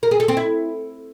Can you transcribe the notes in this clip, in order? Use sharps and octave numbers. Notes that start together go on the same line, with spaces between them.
A#4
G#4
A4
C4
E4